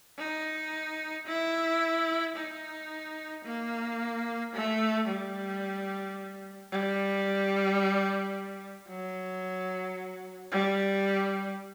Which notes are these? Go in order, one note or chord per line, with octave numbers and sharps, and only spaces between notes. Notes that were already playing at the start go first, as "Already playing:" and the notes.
D#4
E4
D#4
A#3
A3
G3
G3
F#3
G3